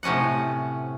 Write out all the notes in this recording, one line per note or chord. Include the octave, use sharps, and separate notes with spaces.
A2 C3 C#4 D#5 F#5